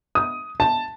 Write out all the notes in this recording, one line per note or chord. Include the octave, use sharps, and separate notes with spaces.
D#6
A5